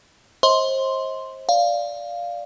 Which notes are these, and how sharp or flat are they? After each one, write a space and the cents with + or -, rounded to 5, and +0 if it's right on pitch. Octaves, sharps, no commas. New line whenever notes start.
C5 +30 D#5 +35 C6 +0
D5 -5 F5 +0